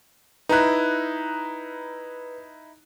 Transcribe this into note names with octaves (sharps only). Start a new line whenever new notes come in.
D#4 E4 B4 A#5 F#6